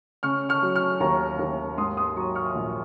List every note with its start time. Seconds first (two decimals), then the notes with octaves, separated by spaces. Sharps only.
0.23 C#3 C#6 F6
0.49 C#6 F6
0.63 F#3
0.75 C#6 F6
1.00 D#2 A#5 C#6
1.39 D#2
1.78 G#2 C6 D#6
1.97 C6 D#6
2.16 F#3 A#5 C#6
2.35 C#6 F6
2.55 A#1